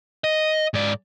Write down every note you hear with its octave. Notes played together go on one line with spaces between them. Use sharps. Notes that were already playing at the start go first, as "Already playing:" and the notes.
D#5
G#2 D5